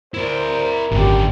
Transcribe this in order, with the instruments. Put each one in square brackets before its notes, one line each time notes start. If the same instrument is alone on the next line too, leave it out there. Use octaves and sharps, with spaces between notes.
[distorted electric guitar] E4 D5 [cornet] A#4 [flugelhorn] C5
[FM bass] G#1 [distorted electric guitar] F#2 D3 [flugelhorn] G4